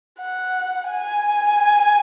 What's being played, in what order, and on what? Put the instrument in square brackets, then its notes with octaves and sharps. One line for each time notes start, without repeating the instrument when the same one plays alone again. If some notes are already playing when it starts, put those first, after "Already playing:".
[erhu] F#5
G#5